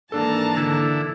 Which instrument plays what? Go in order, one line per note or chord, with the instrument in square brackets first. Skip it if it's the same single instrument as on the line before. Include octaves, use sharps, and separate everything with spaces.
[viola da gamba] G#2 D#3 E3 [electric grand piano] A#3 D4 A4 [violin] A5 A#5
[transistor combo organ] D3 E4